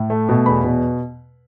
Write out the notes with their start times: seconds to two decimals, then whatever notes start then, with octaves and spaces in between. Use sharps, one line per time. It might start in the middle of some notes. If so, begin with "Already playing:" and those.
Already playing: A2
0.10 A3
0.29 B2
0.46 E2 B5
0.64 B2